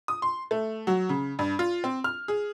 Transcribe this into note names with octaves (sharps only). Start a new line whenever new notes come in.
D#6
C6
A3
F#3
C#3
G2
F4
C4
F6
G#4